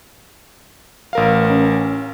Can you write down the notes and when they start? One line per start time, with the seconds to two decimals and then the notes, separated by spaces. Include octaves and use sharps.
1.13 A1 A#4 F5
1.50 C#4